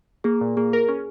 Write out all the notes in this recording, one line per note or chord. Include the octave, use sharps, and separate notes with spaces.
A#3 G#4
A#2
A#3 G#4
A#4
C#4